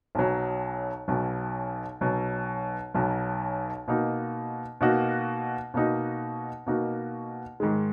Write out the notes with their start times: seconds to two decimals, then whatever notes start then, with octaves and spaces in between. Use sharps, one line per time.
0.15 B1 B2 F#3
1.08 B1 B2 F#3
2.01 B1 B2 F#3
2.94 B1 B2 F#3
3.88 B2 A#3 D#4 F#4
4.81 B2 A#3 D#4 F#4
5.74 B2 A#3 D#4 F#4
6.67 B2 A#3 D#4 F#4
7.60 G#2 D#3 G#3